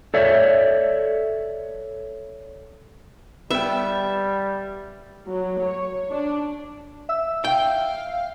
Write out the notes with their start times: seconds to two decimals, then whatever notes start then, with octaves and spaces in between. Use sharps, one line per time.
0.14 A4 C#5 D5 E5
3.51 G3 B3 E5 G5
5.28 F#3
5.61 C#5
6.11 D4
7.09 E5 E6
7.45 F5 G5